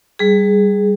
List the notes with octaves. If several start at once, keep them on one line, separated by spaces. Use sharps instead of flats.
G3 G#4